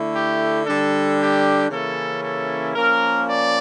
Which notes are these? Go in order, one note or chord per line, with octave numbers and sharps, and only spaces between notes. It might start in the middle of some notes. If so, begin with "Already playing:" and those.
Already playing: D3 A3 E4
G4
D3 G3 D4 A4
G4
C#3 E3 A#3 C#4 E4 A4
A4
F3 A#3 C#4 A#4
D5